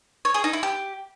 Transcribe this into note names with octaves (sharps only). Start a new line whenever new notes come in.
C#5
G#4
D#4
E4
G4